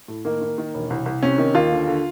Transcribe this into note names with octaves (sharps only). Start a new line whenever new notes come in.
A2
D#3 A#3
D#3
D#3
E1
C2
C2
C3 C#4
D#3
D#2 F4
D3
D3